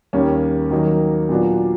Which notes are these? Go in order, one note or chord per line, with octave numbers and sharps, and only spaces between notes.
D#2 D#3 G3 A#3 C#4
D#3 F#3 A#3 D#4
A#2 F#3 B3 D4 F#4